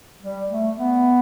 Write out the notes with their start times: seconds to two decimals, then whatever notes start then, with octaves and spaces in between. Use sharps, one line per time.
0.22 G3
0.50 A3
0.78 B3